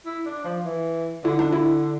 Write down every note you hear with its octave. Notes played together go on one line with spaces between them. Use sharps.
E4
D4
F3
E3
D3 E4
D4
E4